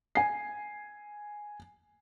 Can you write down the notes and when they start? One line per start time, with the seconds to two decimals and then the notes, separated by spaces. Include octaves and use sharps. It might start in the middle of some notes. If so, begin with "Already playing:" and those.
0.15 G#5 C7